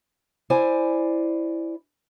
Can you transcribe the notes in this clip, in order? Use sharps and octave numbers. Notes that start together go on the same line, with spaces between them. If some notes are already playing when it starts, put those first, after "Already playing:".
E4 C5 D5 G#5